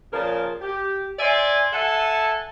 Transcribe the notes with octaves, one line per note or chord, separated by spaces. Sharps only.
A#2 C#3 F3 A#4 A5
G4
C5 D5 E5 G#5
A4 E5 F#5 G#5 A5